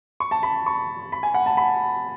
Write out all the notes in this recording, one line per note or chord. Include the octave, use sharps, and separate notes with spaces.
C#6
A5
B5
C#6
B5
G#5
F#5
A5
B5